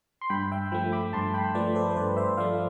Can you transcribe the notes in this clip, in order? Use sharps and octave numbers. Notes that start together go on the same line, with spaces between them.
C6
G2 G5 B5
E5 G5
F3 A3 G5 B5
B5 D6
G2 A5 C6
G5 B5
F3 A3 B4 D5
A4 C5
C5
G2 B4 D5
C5 E5
F3 A3 D5 F5